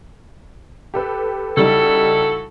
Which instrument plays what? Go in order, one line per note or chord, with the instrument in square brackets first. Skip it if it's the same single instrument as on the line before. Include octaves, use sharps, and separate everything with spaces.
[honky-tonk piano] G4 A4 B4
[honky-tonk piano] C#3 G3 D#4 [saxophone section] E4 F#4 A4